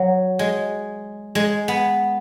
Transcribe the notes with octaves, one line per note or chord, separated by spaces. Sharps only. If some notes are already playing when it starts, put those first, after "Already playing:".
Already playing: F#3
G#3
G#3
B3